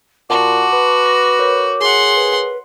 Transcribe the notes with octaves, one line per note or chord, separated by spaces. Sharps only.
A#2 F#4 F#5 A5 C6 D6
B4
A#6
A#4 C#5
G#4 F#5 C6
B4